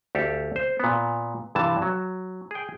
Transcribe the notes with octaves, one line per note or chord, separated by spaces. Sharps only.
D2 G4 A4 F5
C5
A#2 B3
G2 C3 E3 A5
F#3
G#4 G5